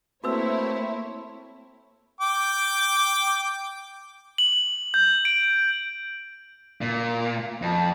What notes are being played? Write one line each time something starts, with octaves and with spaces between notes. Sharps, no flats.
A3 A#3 C4 E4 F#4 B4 C#5 E6
G5 D6
F#7
G6
D7
A#2
F2